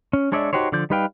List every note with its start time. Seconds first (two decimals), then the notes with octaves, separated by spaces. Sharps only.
0.13 C#4
0.32 G#3 D4 C#5 D5 E5
0.53 D#4 F#4 G4 C5 C#5
0.72 D3 F3 D5 G6
0.90 G3 D#4 B4 F5 G5